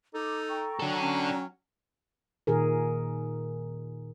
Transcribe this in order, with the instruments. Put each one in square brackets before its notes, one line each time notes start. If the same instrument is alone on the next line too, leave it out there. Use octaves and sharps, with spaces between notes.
[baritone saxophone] D#4 [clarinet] A4 [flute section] A#5 D6
[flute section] G5 A#5 C#6
[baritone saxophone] F#3 [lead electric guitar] D4 A4
[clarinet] C#4
[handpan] A#2 D#3 G#4 A#4